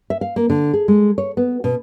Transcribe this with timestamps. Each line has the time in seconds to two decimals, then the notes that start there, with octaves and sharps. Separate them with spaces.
0.10 E5
0.21 F5
0.36 A#3
0.50 D3
0.73 G#4
0.88 G#3
1.18 C#5
1.37 B3
1.64 B2